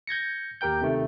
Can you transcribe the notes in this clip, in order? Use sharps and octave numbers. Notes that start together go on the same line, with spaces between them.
G6 G#6 A#6 C#7
D#2 G4 A#4 G5 G6
C3 D#3 A3